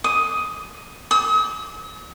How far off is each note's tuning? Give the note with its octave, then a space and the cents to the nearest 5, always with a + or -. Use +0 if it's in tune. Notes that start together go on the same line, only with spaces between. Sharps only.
D#6 +10
D#6 +45